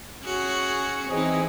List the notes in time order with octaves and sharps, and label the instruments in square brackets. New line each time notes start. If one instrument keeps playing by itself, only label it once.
[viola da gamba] C#4 F#4 G#4
[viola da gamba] E3 D#4 [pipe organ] C4 G#4 D#5